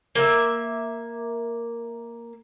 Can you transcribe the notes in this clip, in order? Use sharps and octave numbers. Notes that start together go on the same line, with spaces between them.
A#3 E5